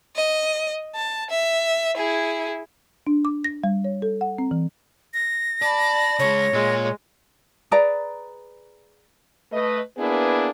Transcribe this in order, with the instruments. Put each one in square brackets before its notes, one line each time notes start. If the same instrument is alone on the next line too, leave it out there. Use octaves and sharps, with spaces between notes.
[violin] D#5
A5
E5
E4 G#4
[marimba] D4
D6
A#6
G3
C#5
A4
F#5
C4
E3
[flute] A#6
[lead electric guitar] D5 [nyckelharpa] A5 B5
[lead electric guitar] C#3 G#3 [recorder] C#5
[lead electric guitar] A#2 [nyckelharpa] G#3
[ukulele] G#4 B4 D5 A#5
[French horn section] A3 B4 D#5
A#3 B3 D4 E4 G#4 B4